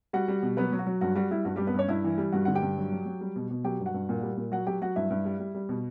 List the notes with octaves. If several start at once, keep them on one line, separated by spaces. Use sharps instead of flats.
G3 F#4 F#5
G3
B2
F#3 B3 B4
F#3
F#4
F#3
G2 F#4
G3 F#4
G3 E4
G2 F#4
G3 G4
G2
B3 B4
G2 C#4 C#5
G2 E4 E5
E3
G3
G2 F#4 F#5
D3 F#5
G4 G5
G2
F#3
F#3
F#3
G3
B2
B2
F#3 G4 G5
G2
F#4 F#5
G2
A#2
G3
A#2
F#3 F#4 F#5
F#3 G4 G5
F#3 F#4 F#5
G2 E4 E5
G2
G3
G3
G3
B2